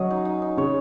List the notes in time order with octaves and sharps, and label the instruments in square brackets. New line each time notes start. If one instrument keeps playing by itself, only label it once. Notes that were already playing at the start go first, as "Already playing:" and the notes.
Already playing: [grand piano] F#3 [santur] C#4 G#4 D#5
[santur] D#4
D#4
D#4
[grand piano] C#3 [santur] C#5